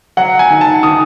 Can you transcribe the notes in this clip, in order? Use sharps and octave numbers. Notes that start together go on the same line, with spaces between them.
F#3 F#5
G#5
D#3
A5
D#3 D#6